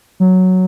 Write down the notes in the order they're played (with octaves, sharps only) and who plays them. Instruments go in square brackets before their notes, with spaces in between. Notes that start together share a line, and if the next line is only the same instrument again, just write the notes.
[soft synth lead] F#3